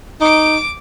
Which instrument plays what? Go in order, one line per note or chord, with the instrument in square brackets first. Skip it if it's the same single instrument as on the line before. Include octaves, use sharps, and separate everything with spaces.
[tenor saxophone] D#4 [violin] D6 D7